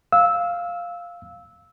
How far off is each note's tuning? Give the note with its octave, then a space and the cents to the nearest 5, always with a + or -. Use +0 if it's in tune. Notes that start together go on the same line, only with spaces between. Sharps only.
F5 +0 E6 -15